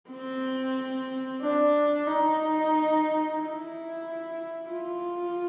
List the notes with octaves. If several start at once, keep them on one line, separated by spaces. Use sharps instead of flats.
C4
D4
D#4
E4
F4